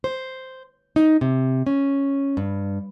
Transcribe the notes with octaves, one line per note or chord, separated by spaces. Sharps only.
C5
D#4
C3
C#4
G2